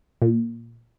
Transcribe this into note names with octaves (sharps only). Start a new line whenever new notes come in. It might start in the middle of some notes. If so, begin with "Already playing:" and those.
A#2